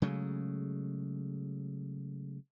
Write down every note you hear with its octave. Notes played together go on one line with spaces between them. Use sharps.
C#3 F#3 G#3 A3